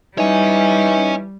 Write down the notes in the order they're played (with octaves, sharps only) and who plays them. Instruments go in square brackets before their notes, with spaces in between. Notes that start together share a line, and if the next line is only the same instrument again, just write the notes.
[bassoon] E3 [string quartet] G3 [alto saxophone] D#4 [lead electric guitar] C#5 G#5